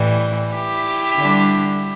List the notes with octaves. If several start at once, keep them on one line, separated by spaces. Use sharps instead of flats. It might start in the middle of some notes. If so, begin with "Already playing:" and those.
Already playing: A2 E3 G3
E4 G4
D3 G3 D4